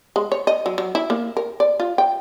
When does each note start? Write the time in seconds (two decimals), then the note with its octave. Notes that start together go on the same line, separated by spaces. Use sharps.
0.16 G#3
0.32 C#5
0.47 D#5
0.66 F#3
0.78 F#3
0.95 E4
1.10 A#3
1.37 A#4
1.60 D5
1.80 F4
1.98 G5